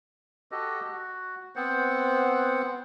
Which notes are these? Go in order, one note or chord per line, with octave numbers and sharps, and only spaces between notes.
F#4 G4 A4 D#5
F#4
B3 C4 C5 F#5